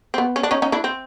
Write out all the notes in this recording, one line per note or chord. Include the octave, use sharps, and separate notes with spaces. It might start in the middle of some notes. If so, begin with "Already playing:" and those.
C4
B3
C#4
D4
C#4 D#4
C#4 D#4
D4 E4
C4